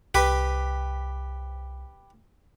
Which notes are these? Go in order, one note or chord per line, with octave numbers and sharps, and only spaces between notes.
C2 G4 B4